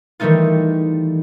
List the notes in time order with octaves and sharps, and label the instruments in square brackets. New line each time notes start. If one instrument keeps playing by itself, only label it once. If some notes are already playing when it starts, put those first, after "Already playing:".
[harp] D#3 E3 G3 A3 D#4 F4